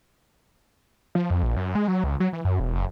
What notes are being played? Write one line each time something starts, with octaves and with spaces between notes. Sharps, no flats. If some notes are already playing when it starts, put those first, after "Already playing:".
F3
F2
A#1
F#2
G#3
F#3
C#2
F#3
E3
F#2
E1
F#1